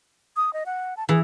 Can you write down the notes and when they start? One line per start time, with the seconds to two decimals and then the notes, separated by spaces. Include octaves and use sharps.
0.36 D#6
0.53 D#5
0.66 F#5
0.97 A5
1.09 E3 G#4